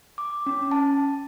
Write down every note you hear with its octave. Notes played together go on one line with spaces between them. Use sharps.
D6
C#4
A5